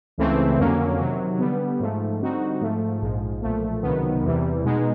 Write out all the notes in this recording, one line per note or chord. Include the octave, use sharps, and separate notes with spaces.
C#2 C#3 E3 A3 C4
F2 D3 F#3 A#3 C#4
C3 D#3 F#3
D3 G3 B3
G#2 F3 A3
D3 G3 C4 D#4 F#4
G#2 F3 A3
A#1 G#2 F3 G#3
B1 A#2 F3 A3
C#2 C3 D#3 F#3 B3
E2 C3 E3 G3
B2 G#3 B3 D#4